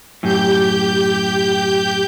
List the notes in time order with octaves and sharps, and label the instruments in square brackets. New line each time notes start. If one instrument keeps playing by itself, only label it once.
[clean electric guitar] F#2 A2 [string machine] G4 G6